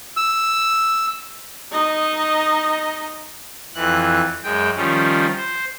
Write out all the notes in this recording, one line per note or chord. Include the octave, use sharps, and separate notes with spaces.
E6
D#4 D#5
F2 E3 F#6
F#2 G#3 G5
D#3 F3 G3 C#4
C5